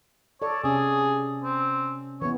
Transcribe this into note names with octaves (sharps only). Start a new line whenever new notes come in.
A4 C#5 D5
C3 C#4 G#4
C4
E3 B3 C#5